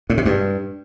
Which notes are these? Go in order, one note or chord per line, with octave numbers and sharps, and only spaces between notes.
A2
C3
G2